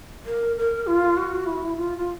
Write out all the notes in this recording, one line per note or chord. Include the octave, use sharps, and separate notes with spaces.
A#4
A#4
F4
F#4
E4
F4
F4